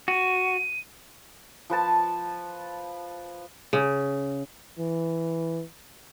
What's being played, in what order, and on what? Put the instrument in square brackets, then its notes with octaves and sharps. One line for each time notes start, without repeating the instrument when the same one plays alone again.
[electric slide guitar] F#4 [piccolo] D#7
[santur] F3 B4 A5
[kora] C#3
[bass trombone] E3